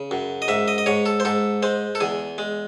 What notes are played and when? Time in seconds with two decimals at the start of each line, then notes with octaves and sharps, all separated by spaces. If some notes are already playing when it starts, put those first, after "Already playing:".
Already playing: C#3
0.11 F#2
0.42 D#5
0.48 G#2 E5
0.68 D#5
0.78 D#5
0.86 G#2 C#5
1.06 A4
1.20 C5
1.25 G#2 A4
1.63 G#3 C5
1.95 A4
2.00 E2 G#4
2.38 G#3